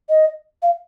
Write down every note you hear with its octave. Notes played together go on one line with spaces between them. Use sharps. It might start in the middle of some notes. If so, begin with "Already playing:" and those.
D#5
F5